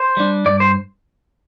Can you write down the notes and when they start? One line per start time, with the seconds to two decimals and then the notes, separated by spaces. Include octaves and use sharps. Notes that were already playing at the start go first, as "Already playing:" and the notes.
Already playing: C5
0.17 G3 D4
0.45 G2 D5
0.60 C5